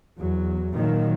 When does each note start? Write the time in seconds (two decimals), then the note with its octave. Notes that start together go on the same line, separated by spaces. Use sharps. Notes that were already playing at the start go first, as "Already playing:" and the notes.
0.18 E2 F#3
0.76 A#2 D#3 F#3 A#3